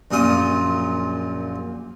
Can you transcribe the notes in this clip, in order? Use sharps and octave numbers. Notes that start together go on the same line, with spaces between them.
A#1 F#2 A#2 F4 D#6